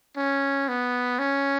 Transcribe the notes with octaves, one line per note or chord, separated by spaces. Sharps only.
C#4
B3
C#4